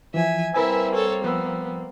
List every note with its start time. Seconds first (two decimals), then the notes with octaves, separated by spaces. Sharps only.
0.14 E3 F3 E5 G#5
0.54 G3 A#3 C4 E4 A#4 B4 E5 G#5
0.94 A4 C#5
1.24 F3 B3 E6